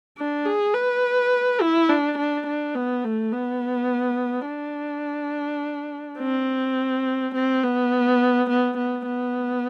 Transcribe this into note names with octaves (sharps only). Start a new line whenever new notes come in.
D4
G#4
B4
E4
D4
D4
D4
B3
A3
B3
D4
C4
C4
B3
B3
B3
B3